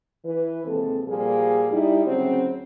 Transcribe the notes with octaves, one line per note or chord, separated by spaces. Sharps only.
E3 B4
D#2 C3 G#3 C4 A4
A#2 F3 G3 A#3 G#4
G3 D#4 E4
D2 C#3 F#3 C4 F#4 C5